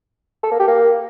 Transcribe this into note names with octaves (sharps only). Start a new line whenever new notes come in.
A4
A#3
G4
A#3